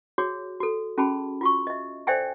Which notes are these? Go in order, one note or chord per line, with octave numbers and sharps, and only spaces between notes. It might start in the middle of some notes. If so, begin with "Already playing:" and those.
F#4 G#4 C#5
F#4 A4
C#4 F#4 G#4 A5 B5
F4 F#4 C#6
D#5 E5
A4 C5 D5 E5 G5 G#5